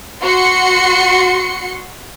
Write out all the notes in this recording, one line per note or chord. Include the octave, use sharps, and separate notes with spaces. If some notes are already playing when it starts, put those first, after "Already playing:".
F#4 C6 C#7